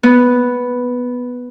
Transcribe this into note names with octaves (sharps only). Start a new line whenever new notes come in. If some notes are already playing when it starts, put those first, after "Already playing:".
B3